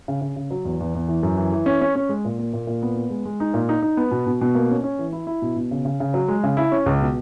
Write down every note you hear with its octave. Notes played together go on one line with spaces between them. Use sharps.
C#3
C#3
C#3
F#3
E2
E2
E2
E3
F#2
E3
E3
C#4
C#4
C#4
G#3
A#2
A#3
A#2
A#2
B3
B3
G#3
G#3
D#4
A#2
D#4
D#4
B3
B2
B2
B2
A#3
C#4
C#4
E3
E4
E4
B2
B2
C#3
C#3
C#3
F#3
G#3
C#3
E4
C#4
C#2
B2